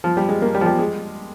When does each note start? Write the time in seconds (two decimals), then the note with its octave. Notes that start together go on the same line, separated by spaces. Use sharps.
0.04 F3
0.17 G3
0.29 G#3
0.42 A#3
0.55 G3
0.61 F3
0.66 G3
0.79 G#3